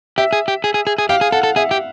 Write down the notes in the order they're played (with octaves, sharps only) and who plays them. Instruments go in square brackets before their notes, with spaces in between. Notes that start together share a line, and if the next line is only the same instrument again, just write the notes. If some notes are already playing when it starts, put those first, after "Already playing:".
[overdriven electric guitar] G4 [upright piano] E5
[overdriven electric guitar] G#4
G4
G#4
G#4
G#4
G#4
[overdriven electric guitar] G4 [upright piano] F5
[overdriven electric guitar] G#4
[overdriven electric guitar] A4 [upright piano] F#5
[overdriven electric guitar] A4
[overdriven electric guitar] G#4 [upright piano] E5
[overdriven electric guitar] G4